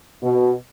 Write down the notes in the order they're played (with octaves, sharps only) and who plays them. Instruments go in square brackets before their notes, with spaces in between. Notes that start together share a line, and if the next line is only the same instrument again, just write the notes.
[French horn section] B2